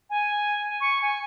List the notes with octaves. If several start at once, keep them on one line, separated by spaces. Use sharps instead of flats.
G#5
C#6
G#5